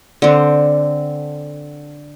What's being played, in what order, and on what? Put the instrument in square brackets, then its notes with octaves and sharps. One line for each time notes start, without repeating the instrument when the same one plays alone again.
[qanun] D3 C4